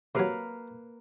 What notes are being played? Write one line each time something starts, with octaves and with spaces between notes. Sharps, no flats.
C3 F#3 A#3 B4 F5